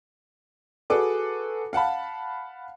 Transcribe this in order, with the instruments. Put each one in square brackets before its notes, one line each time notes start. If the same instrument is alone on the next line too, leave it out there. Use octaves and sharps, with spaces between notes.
[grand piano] F#4 G#4 A4 B4 D6
F5 F#5 A5 B5